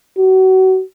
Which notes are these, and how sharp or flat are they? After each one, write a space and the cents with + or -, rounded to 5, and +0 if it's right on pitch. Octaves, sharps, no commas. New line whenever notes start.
F#4 +30